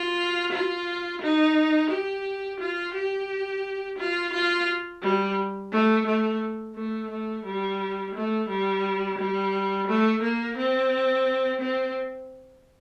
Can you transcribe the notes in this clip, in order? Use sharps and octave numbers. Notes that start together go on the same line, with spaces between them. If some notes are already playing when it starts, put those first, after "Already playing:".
Already playing: F4
F4
D#4
G4
F4
G4
F4
F4
G3
A3
A3
A3
A3
G3
A3
G3
G3
A3
A#3
C4
C4